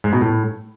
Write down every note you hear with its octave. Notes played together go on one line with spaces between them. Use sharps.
G#2
B2
A2